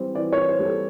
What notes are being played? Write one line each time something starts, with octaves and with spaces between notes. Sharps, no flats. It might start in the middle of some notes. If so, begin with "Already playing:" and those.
Already playing: E3 G3 C4
E3 D5
E3 C#5
C5
G3
A4